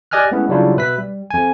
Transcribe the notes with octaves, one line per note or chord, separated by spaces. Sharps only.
G4 D5 D#5 G#5 F6 F#6
G#3 A3 B3 C#4 E4
C#3 F#3 G3 D4 E4 F4
B2 B4 E5 B6
G3
F2 G#5